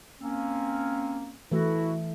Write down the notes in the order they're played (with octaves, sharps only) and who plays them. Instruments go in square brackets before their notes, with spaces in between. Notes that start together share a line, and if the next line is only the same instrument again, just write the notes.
[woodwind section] A#3 C4 C#4
[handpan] E3 A3 [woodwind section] E4 F#4